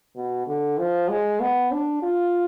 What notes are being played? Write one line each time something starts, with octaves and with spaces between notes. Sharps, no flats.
B2
D3
F3
G#3
B3
D4
F4